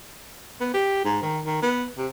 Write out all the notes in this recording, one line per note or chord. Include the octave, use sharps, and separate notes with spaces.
B3
G4
G#2
D#3
D#3
B3
C3